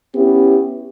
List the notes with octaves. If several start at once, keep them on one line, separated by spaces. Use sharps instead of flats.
B3 C#4 E4 G4